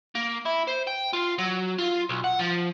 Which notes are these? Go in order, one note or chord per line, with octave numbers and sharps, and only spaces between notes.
A#3
E4
C5
G5
F4
F#3
F4
B1
F#5
F3